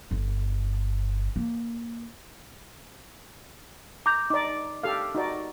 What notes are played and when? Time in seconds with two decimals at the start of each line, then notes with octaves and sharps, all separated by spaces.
0.11 G1
1.36 A#3
4.06 A#5 D6 G6
4.30 D#4 D5 D6
4.83 G4 A4 F5
5.15 D#4 F#4 D5